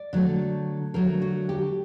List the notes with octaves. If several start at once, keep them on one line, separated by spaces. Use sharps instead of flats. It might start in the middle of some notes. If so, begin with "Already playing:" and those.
Already playing: D5
D3 F#3 A3
D3 F#3 A3 A#4
F#4
G4